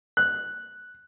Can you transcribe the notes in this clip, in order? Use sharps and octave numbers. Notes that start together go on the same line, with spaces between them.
F#6